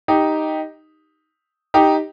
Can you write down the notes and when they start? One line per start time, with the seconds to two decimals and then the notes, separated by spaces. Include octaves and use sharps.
0.08 D#4 G4
1.74 D#4 G4